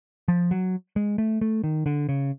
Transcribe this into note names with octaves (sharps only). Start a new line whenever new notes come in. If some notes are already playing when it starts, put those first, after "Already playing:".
F3
F#3
G#3
A3
A3
D#3
D3
C#3